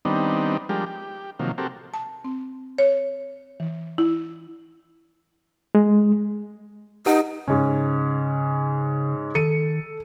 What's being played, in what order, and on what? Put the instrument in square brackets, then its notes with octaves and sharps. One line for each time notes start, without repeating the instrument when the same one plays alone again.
[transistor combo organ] D#3 G3 B3 C4 D4 D#4
F3 G3 G#3 D4 G4 A#4
G4
C3 D#3 F3 F#3 A#3
C4 F#4 G4 A4 A#4
[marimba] A5
C4
C#5
E3
E4
[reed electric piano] G#3
[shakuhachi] D#4 [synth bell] G4 F#5
[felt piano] G#2 C#4 [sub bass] C#3
[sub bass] D#3 [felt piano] A4 C#7 D#7